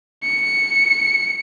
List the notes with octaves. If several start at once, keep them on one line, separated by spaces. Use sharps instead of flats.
C#7